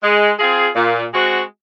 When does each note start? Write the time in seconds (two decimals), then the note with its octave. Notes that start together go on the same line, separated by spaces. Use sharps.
0.02 G#3
0.39 C4 F4 G#4
0.75 A#2
1.12 G#3 C4 F#4